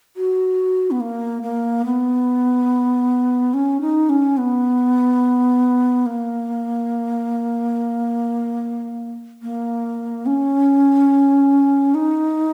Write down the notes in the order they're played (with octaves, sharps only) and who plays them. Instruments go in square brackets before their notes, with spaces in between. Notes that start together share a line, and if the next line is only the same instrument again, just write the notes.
[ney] F#4
B3
A#3
A#3
B3
C#4
D#4
C#4
B3
A#3
A#3
C#4
D#4